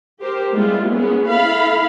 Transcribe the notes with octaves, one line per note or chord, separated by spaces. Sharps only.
G4 A#4 C5
G3 G#3 B3 E4 F4
A#3 B3 C#4 G#4
E4 A4 F5 B5